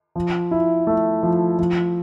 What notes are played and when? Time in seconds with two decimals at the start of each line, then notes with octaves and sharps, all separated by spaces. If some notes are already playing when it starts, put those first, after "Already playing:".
0.16 F3
0.51 E4
0.87 A3
1.23 F3
1.59 F3